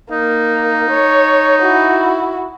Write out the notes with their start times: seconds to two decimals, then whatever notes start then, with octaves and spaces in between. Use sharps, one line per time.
0.11 A#3 D#4
0.90 C#5
1.62 E4 F#4